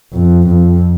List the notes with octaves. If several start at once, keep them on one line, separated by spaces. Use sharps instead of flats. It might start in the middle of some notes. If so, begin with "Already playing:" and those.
F2
F2